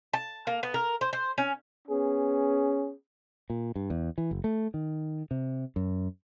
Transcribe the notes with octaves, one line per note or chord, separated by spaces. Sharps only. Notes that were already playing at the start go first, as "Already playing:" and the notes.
A5
A#3
B3
A#4
C5
C5
C#4
B3 C#4 G#4
A#2
G2
E2
E3
F#1
A3
D#3
C3
F#2